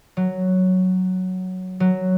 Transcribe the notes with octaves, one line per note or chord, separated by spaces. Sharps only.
F#3
F#3